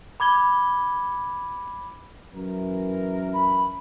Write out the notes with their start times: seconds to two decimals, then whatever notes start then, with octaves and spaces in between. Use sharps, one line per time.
0.20 B5 D6 G#6 G7
2.34 F#2 E3 A#4
3.34 B5